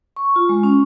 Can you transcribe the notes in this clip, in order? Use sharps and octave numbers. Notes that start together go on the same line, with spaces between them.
C#6
F4
G#3
C#4